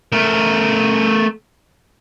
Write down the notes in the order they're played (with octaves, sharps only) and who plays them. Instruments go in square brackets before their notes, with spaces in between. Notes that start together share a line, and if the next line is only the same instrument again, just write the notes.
[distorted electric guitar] A3 A#4